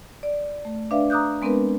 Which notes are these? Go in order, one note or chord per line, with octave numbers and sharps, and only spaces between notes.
D5
A3
D4 B4 D5 E5 F5
A#5 D6 D#6 F#6 G6
G#3 B3 C4 D4 A#4 B4